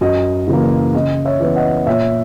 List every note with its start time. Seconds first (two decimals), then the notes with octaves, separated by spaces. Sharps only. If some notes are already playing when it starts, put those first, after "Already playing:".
0.01 F#2 D#5
0.48 C#3 E3 A#3
0.94 C#3 D#5
1.25 C#5 E5
1.40 E3 B3
1.56 D#5 F#5
1.86 A#2 C#5 E5